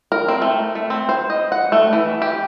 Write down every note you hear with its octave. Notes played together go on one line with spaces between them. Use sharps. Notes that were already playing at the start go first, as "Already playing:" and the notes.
A#4
C4
A3
A3
C4
C5
D#5
F#5
A3
E3
G4